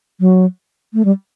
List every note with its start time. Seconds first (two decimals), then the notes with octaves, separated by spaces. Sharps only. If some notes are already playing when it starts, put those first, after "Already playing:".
0.20 F#3
0.94 A3
1.05 G3